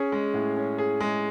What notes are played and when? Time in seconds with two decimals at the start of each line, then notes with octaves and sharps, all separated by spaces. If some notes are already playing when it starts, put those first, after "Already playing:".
Already playing: C#4 G#4
0.12 G#3
0.34 A2
0.56 C#4
0.78 G#4
1.00 G#3